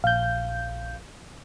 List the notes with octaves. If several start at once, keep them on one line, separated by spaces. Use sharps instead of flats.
A#1 F5 G6